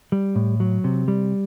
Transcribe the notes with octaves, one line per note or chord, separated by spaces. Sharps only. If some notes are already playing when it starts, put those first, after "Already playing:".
G3
A2
F#3
C3
G3